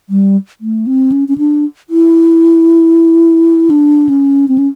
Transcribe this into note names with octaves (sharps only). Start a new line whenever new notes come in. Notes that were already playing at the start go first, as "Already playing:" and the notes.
G3
A3
C4
C#4
C#4
D4
E4
D4
C#4
C4
C#4